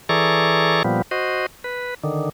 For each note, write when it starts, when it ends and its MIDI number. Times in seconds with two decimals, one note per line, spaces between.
0.09 0.83 52
0.09 0.83 68
0.09 0.83 69
0.09 0.83 74
0.09 0.83 82
0.09 0.83 85
0.84 1.02 46
0.84 1.02 53
0.84 1.02 55
0.84 1.02 59
1.11 1.46 66
1.11 1.46 72
1.11 1.46 75
1.64 1.94 71
2.04 2.29 50
2.04 2.29 51